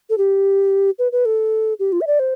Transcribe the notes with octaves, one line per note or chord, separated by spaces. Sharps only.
A4
G4
B4
B4
A4
G4
F4
E5
D5
C5